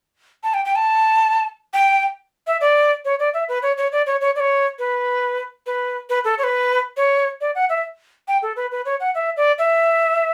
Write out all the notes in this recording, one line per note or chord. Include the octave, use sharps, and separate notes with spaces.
A5
G5
G5
A5
G5
E5
D5
C#5
D5
E5
B4
C#5
C#5
D5
C#5
C#5
D5
C#5
B4
B4
B4
A4
C#5
B4
C#5
D5
F#5
E5
G5
A4
B4
B4
C#5
F#5
E5
D5
E5